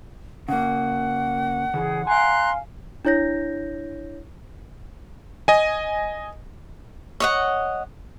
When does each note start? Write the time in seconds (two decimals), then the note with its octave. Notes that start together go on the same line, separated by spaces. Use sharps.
0.49 C#3 A#3 F#5
1.74 C#3 E3 G#4
2.07 F5 G#5 A#5 C6 F#6
3.05 D4 E4 C#5 G6 A#6
5.48 D#5 G#5
7.20 C#5 D#5 F#5